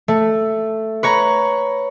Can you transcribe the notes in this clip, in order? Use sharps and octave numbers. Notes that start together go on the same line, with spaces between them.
A3
B4 C#5 A#5